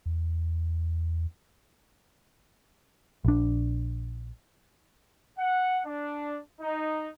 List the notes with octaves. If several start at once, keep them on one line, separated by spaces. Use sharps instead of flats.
E2
A#1 D4
F#5
D4
D#4